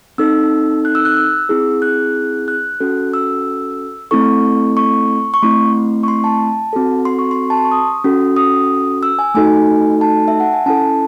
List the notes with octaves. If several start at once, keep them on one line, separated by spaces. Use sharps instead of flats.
C4 D#4 A4 E6
F#6
E6
F#6
E6
C4 E4 G#4
F#6
F#6
C#4 F#4 A4
E6
A3 C4 E4 A4 C#6
C#6
C#6
A3 C4 E4 C6
C#6
C6
A5
C4 F#4 A4
C6
C#6
C6
A5
C6
C#6
D#6
C#4 F#4 A4
D#6
E6
G#5
A3 D#4 F#4 A4 G#5
A5
E5
F#5
G#5
C#4 E4 A4 A5